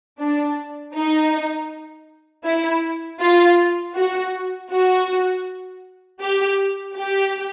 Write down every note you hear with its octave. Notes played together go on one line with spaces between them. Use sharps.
D4
D#4
E4
F4
F#4
F#4
G4
G4